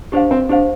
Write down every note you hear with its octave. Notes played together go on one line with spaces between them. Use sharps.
D4 G4 C5 F5
C4
D4 G4 C5 F5